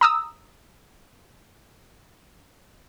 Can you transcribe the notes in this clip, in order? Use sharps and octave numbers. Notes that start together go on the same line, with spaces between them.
A#5 D#6 E6